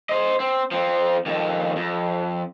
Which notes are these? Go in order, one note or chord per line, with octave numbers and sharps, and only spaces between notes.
C5 D#5
C4
F3 C4
F2 D#3
F2